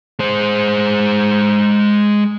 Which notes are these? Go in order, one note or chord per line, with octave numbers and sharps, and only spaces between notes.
G#3 C5